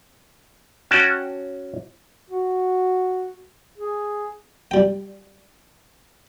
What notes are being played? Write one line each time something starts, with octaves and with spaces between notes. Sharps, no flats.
C#4 F#4 F#5 G5 A5
F#4
G#4
G3 G5